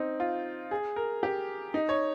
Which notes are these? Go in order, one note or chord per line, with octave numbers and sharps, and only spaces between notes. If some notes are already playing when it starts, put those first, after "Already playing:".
Already playing: C4 D#4
F4
G#4
A#4
G4
D#4
C#5